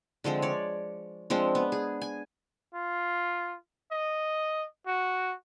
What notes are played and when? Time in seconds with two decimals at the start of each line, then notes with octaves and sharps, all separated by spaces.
0.24 D3 F3 G#3 C4
0.42 C#5 D5
1.30 F3 G#3 C4 D4
1.55 B3
1.72 G#4
2.01 G#5
2.74 F4
3.92 D#5
4.87 F#4